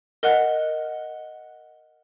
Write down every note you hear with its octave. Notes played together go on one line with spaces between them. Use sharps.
A#4 D#5 F#5 F#6